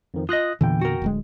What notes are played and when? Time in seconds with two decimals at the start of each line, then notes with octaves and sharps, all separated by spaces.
0.14 F2 D#3 F3
0.29 F4 D#5 D#6 F#6 A#6
0.61 E2 A#2 D3 E3 G5
0.81 F#4 A#4
1.02 D1 D2 G#3